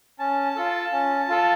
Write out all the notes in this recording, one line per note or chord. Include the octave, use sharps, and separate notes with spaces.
C#4 A5
F4 A4
C#4
F4 A4